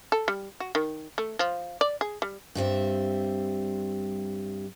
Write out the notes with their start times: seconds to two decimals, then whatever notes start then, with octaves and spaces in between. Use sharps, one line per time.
0.12 A4
0.28 G3
0.60 F#4
0.75 D#3
1.18 A3
1.39 F3
1.81 D5
2.01 G#4
2.22 G3
2.55 G2 G3 C4 E5